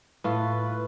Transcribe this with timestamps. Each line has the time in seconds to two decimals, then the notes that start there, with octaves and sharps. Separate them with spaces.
0.24 A2 F4 B4